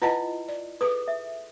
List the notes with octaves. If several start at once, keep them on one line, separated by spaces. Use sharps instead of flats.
E4 F4 B4 D#5 F#5 A5
D5
G#4 A4 B4 D#6
E5